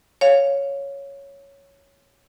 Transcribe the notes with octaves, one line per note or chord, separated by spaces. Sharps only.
C#5 F5